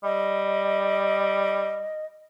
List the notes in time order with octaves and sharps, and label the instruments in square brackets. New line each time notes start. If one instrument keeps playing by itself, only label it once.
[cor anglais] G3 [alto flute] D#5